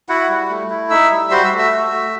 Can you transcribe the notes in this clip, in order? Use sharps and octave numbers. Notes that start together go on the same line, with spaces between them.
E4 F#4 F#5
G3
A3
E4
D#4 E5 E6
G3
F#4 C5 C6
E5 E6
A3
E5 E6
F#4
A3